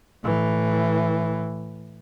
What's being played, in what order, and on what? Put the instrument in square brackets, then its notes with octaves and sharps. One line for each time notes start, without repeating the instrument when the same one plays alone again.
[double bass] A2 E3